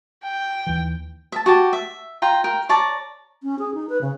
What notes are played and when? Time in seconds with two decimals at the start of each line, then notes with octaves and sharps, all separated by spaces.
0.24 G5
0.66 D#2 E3
1.32 E5 A5
1.46 F#4 G4 A5
1.73 E5
2.22 F4 G5 A#5
2.44 A#4 G5
2.69 C#5 D5 A5 A#5
3.43 C#4
3.59 G#4
3.74 D#4
3.89 B4
4.01 C#3